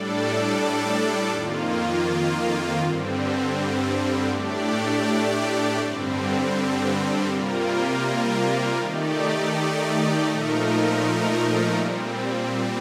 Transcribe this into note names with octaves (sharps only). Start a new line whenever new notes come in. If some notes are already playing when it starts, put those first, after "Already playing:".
Already playing: A2 G3 D4 A4 D5
F2 D#3 A#3 F4
G2 D3 G3 C4
A2 A3 D4 G4 D5
G2 D3 G3 C4
C3 G3 A#3 F4 A#4
D#3 A3 D#4 G4 D5
A#2 F3 A3 D#4 A#4
A#2 G3 C4